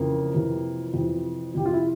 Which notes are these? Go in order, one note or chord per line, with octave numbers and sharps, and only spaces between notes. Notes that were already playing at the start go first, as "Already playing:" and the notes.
Already playing: F2 C#3 E3 A#3
F2 C3 E3
F2 C3 E3
F2 C3 E3 G4
F4
E4